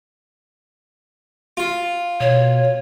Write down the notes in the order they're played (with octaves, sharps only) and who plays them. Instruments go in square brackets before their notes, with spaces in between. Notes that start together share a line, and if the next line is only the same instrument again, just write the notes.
[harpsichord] F4
[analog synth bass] B2 [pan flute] C#5